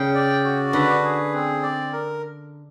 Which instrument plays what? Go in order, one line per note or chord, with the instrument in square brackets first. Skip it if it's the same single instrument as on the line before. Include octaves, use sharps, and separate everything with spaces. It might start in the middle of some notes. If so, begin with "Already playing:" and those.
Already playing: [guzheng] C#3 [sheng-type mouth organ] G5
[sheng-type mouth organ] D5
F#4
[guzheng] D3 [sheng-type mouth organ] B4
[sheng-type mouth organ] G#4
C4
D5
A#4